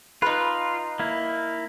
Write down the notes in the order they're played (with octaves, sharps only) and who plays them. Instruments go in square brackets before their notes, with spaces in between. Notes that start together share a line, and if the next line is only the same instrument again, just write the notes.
[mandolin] D#4 B4 [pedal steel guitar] F4
[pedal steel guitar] A#3 E4